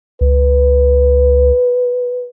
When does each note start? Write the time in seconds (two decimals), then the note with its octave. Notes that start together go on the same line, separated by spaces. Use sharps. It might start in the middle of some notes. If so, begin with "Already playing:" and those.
0.21 C#2 B4